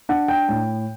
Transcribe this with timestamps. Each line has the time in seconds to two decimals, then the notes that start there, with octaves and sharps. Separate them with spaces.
0.09 D4 F#5
0.28 G5
0.49 A2 G5